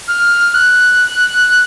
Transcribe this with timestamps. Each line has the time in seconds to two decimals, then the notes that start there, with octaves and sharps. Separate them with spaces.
0.08 F6
0.54 F#6